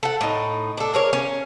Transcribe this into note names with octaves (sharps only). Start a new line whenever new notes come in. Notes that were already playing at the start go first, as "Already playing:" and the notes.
A4 F#5
A2 D#4
D4 A4
G#4 A#4 C#5
C#4